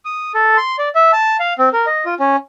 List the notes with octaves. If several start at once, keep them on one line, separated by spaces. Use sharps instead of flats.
D#6
A4
C6
D5
E5
A5
F5
C4
A#4
D#5
F4
C#4